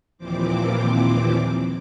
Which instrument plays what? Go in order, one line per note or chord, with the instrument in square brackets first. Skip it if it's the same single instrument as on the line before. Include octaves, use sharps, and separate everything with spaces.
[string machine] D#2 A#2 E3 F3 C4 D6